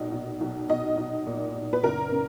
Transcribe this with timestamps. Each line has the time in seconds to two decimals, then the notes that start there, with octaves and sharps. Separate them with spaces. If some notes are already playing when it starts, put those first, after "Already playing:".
Already playing: B1 A#2 D#5
0.12 B1
0.41 B1
0.69 B1 D#5
0.98 B1
1.27 A#2
1.55 A#2
1.73 B4
1.83 F#1 A#4
2.12 C#3